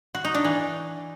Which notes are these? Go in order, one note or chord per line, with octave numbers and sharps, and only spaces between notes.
F#4
D#4
D4
E3